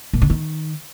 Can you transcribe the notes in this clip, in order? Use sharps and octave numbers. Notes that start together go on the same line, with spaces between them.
A#2
D3
D#3